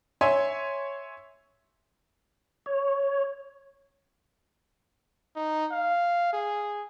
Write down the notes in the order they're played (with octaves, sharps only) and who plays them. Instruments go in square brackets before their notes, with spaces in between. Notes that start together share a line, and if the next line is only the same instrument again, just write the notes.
[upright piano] C#5 E5 G#5 C6
[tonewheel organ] C#5
[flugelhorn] D#4
F5
G#4